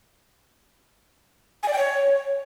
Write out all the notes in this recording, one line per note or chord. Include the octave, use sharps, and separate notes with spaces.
G#5
D5
G5
C#5